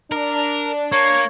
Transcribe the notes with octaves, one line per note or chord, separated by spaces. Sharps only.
D4 A#4
A#3 C#5